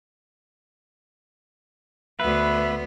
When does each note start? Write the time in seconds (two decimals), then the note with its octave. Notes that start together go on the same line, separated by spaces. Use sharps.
2.20 D2 B3 B4 E5